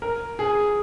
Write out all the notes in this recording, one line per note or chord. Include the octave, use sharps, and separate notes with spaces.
A#4
G#4